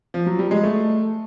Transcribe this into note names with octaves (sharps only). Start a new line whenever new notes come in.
F3
F#3
G3
G#3
A3